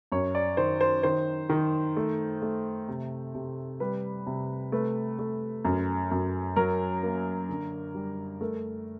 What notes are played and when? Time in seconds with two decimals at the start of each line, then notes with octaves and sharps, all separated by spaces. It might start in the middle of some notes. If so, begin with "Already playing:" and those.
0.12 F#2 C#5
0.35 D5
0.57 D#3 C5
0.81 C5
1.03 D#3 C5
1.49 D#3
1.97 A3
2.42 A3
2.88 C3
3.35 C3
3.80 G3 B4
4.27 C3
4.72 A3 B4
5.19 A3
5.65 F#2
6.11 F#2
6.56 F#3 A#4
7.03 A#3
7.49 D3
7.95 G3
8.41 A3 A#4